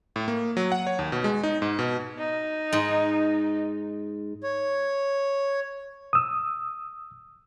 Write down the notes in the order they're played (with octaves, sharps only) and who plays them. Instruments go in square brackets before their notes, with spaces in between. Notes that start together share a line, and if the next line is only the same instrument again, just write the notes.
[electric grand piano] A2
A#3
F#3
F#5
C#5
D#2
B2
G#3
D#4
G#2
B2
[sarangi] D#4
[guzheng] G#2
[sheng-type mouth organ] C#5
[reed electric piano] D#6 E6